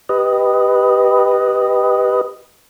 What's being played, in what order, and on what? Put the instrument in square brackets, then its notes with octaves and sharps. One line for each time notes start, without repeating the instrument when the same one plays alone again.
[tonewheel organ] G4 B4 D#5